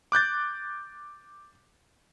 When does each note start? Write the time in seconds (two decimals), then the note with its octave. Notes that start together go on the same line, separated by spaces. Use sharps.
0.12 D6 F#6 G6 A6